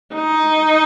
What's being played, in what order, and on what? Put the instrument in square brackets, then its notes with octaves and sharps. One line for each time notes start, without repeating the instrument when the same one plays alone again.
[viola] D#4